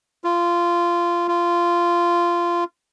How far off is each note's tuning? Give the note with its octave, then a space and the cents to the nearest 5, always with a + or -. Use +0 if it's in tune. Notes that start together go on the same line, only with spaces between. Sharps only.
F4 -15
F4 -15